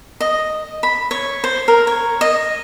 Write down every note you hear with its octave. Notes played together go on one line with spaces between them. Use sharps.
D#5
B5
C#5
C5
A#4
C#5
D#5